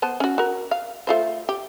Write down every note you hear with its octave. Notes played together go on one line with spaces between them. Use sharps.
B3 C5 A5
C#4 F#4
F#4 A#4
F5
A3 F4 C5
G4